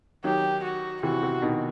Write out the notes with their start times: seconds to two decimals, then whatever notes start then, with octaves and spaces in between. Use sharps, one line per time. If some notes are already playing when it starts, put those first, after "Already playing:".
0.24 D#3 F#3 G4
0.64 F#4
1.03 C3 E3 F#4
1.23 C3
1.42 B2 D#3